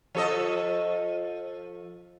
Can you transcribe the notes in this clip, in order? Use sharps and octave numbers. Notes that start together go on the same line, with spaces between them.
F3 A4 D#5